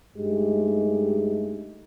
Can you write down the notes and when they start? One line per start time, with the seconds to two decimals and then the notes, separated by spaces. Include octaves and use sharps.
0.16 G2 G#3 A3 D#4 G4